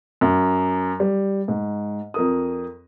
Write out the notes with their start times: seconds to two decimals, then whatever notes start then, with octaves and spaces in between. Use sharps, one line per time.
0.21 F#2
1.00 G3
1.48 G#2
2.14 F2 A#4 D#6